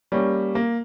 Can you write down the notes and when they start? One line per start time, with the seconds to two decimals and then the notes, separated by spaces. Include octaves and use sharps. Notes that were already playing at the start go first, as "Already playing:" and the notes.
0.12 G3 A#3 C#4
0.55 A#3